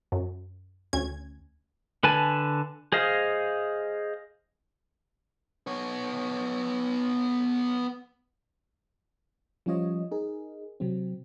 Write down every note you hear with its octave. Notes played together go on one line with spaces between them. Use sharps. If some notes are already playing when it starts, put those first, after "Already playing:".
F#2
D2 C#4 G#6
D3 B4 G#5 A5
G#4 C5 D#5 F5
B3 C#5
F3 G3 C#4 F4 C#5 D#5
D#4 G#4 A#4
C3 F#3 C4